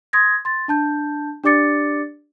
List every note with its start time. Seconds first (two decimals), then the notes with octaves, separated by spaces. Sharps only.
0.13 C6 D#6 G#6 A#6
0.45 C6 A6
0.68 D4 A5 G6
1.44 D4 G4 D5 D6 A6 C#7